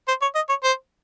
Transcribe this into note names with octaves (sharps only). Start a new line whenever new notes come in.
C5
C#5
D#5
C#5
C5